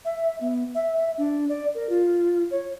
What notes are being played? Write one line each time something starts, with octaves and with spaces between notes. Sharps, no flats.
E5
B3
E5
E5
D4
D5
A#4
F4
C#5